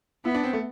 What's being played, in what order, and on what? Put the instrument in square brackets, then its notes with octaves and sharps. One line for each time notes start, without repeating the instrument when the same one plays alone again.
[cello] B3 [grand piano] E4
[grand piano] D4
C4
A3